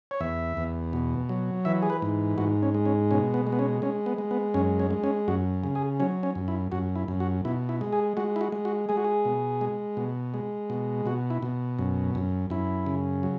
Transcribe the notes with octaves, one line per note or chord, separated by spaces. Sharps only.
C#5
E2 E5
E2
B2
F#3
E3 E5
G#4
B4
G#2
G#2 F#4
C#4
G#3
C#4
B2 C#4
B3
G#3
B3
C#4
G#3 C#4
B3
G#3
B3
F#2 C#4
C#4
G#3
C#4
F#2 F#4
C#3
G#4
F#3 C#4
C#4
F#2
E4
F#2 F#4
E4
F#2
F#4
B2 E4
E4
G#3
G#4
G#3 F#4
E4
F#4
G#3
F#4
G#3 G#4
F#4
G#4
B2
G#3
B2
G#3
B2
B2 F#4
E4
B2
F#2
F#2
F#2 E4
C#3
F#3